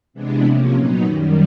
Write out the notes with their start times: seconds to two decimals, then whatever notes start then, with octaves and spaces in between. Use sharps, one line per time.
0.14 C3 E3 G#3 B3 D4
0.43 C3 F3 A#3 C#4
0.73 A#2 F#3 B3 D#4
1.03 F#2 D#3 G3